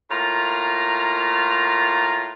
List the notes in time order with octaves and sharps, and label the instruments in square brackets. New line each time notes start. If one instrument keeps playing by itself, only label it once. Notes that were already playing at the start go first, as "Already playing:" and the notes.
[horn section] A2 A#3 F4 A#5